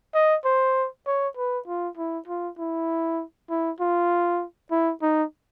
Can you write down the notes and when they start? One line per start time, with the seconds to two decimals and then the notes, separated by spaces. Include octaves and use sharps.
0.14 D#5
0.45 C5
1.07 C#5
1.37 B4
1.67 F4
1.97 E4
2.28 F4
2.59 E4
3.50 E4
3.80 F4
4.71 E4
5.02 D#4